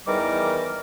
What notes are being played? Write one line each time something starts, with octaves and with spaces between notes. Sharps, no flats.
E2 D#3 E3 G3 A#4 D6